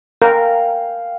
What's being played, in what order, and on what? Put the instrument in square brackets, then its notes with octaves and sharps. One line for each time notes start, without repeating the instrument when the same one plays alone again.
[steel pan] A#4 [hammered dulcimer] F5 G5 G#5